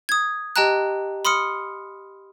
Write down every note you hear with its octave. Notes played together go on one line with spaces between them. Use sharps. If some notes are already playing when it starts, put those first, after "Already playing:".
D#6 G#6
G4 D#5 G5 A5 A#5 F#6
B5 C6 D#6 F6 C#7